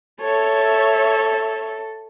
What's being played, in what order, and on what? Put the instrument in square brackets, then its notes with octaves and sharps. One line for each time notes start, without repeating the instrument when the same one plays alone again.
[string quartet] A4 [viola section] C#5 E5